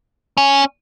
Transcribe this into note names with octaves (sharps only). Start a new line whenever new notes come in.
C#4